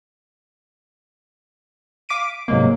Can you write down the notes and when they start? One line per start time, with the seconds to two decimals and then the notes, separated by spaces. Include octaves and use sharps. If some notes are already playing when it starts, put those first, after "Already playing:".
2.09 F5 D6 B6 D7 D#7
2.24 D7
2.48 G#2 C3 F#3 G#3 A#3